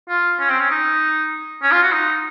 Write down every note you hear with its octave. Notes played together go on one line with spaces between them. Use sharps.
F4
C#4
C4
C#4
D#4
C#4
F4
F#4
D#4